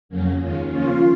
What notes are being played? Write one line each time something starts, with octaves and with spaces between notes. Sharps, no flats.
F2 C#3 F#3 A#3 C#4
D#2 D#3 G#3 C#4 F4
C#3 F3 A#3 C#4 F4